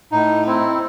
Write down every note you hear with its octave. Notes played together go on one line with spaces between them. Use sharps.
A2 D#4
C4 E4